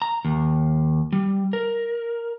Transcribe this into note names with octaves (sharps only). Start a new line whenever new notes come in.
A#5
D#2
G3
A#4